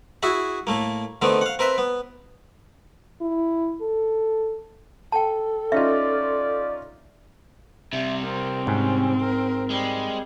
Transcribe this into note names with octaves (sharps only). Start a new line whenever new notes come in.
E4 F#4 G#4 E5
A2 A3 A#3
D3 D#3 A3 B3 C4
F5 F#5
C4 A#4 B4 E5
B3
E4
A4
A4 G5 A5
C#4 D#4 F4 D5 E5
C3 G3 E5
C4 A#4
G#2 C#4
A#4
G3 G#3